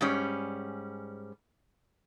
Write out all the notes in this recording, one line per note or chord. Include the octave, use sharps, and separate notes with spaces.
G#2 G3 C#4